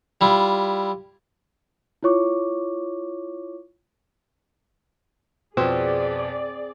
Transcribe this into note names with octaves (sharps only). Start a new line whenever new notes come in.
G3 E4 F4
E4 F4 C#5 C#6 D6
F2 B2 C4 G#4 D5